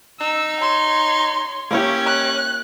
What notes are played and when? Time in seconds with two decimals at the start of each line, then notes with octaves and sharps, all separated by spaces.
0.21 D#4 E6
0.61 C#5 C6
1.71 A#3 C#4 E4 G4 C#5 G#6
2.06 F#6